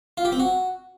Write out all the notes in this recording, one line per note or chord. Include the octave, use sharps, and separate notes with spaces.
F4
G4
C4
F#4